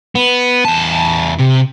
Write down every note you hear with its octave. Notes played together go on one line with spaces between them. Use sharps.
B3
E2 A5
C3